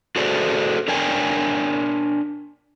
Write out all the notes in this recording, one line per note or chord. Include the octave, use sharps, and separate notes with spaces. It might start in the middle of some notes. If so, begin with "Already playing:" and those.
F#4 G#4 A4 C5 D5
D4 A#4 C#5 D5 G5 G#5